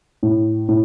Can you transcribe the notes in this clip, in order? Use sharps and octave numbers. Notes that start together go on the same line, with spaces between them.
A2
A2